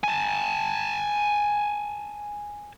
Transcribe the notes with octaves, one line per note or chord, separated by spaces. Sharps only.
G#5 A5